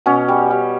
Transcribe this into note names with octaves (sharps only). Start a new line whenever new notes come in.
B2 C#4
G3
G3